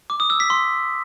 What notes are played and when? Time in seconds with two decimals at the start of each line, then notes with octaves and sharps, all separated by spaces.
0.10 D6
0.20 D#6
0.30 E6
0.40 B6
0.50 C6